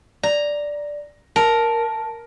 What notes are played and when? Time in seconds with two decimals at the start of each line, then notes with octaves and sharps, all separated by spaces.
0.23 D5 A#5
1.36 A#4 A5